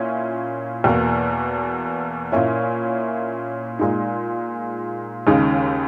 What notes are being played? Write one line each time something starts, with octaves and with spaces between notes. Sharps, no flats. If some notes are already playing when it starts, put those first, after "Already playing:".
Already playing: A#2 C#4 E4
E2 B2 A#3
A#2 A#3 C#4 E4
A#2 G#3 D#4
D#2 C#3 G#3 D#4